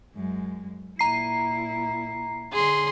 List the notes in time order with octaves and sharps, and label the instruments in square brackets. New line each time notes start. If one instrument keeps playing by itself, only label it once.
[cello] F#2 G#3
[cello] A#2 E4 [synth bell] A#5 C7
[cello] D3 C#4 [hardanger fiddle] G#4 C6